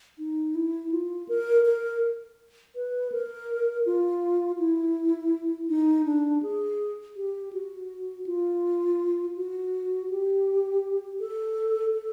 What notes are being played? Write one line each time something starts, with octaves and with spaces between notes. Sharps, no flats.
D#4
E4
F4
A#4
A#4
B4
A#4
F4
E4
D#4
D4
G#4
G4
F#4
F4
F#4
G4
A4
A4